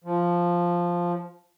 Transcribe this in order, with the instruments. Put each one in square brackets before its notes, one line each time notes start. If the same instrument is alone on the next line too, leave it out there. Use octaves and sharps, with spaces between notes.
[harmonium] F3